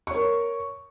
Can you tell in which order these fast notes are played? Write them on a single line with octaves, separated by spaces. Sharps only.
C#6 C#5 A#4